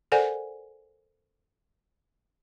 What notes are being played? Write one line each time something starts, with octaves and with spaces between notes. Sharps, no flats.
A4 A#4 C5 D5 F#5 G#5